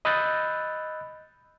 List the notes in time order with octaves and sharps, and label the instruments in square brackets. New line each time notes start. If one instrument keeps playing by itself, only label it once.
[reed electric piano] D#5 B5 E6 F#6 G6 A6